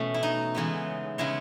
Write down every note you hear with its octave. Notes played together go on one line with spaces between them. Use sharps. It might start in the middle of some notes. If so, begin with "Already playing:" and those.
Already playing: B2 E3 A3 C#4
E4
D#4
C#3 E3 G#3 B3
C#3 G#3 B3 E4